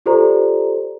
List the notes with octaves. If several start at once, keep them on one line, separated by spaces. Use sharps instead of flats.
F4 G4 A4 C5 D5 A#5